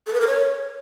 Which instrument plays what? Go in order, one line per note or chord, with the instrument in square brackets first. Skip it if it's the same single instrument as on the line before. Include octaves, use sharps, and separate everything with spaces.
[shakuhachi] A4
B4
A#4
C#5